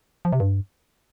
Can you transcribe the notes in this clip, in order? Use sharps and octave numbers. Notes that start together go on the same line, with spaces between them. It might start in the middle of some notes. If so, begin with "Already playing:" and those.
F3
C3
G2